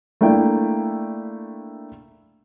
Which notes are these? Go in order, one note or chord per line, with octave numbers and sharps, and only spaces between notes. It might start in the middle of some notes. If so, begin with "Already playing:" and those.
A3 A#3 D4 E4 G5